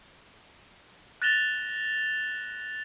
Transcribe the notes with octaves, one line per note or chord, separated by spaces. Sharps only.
F#6 A6 A#6 E7 F7 G7